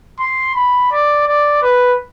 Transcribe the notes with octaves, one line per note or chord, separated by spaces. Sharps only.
C6
B5
D5
D5
B4